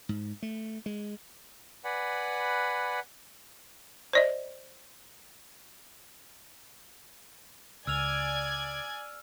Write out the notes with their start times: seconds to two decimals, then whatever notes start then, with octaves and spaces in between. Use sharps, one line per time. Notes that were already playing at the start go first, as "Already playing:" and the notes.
0.09 G#2
0.42 A3
0.86 G#3
1.84 B4 D5 F#5 G#5 B5
4.13 C5 D5 D#5
7.87 C#2 D5 G#5 E6 F6 G#6 F7